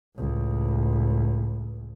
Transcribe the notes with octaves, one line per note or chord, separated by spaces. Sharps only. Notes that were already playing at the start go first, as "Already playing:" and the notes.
C#2 A2